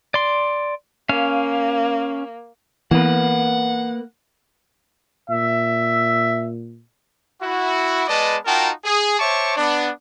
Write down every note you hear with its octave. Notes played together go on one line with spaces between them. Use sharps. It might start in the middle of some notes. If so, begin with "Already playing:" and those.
D5 C6
A#3 C#4 F5
E3 A#3 B3 B4 F#5
A#2 E5
E4 F#4
G#3 B3 B4 D5 D#5 A5
D#4 F4 F#4 A#4 G5 A5
G#4
C5 C#5 E5 A5 C#6 D6
B3 D4